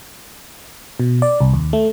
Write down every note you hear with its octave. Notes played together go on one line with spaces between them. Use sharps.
B2
D5
C2
D#2
A3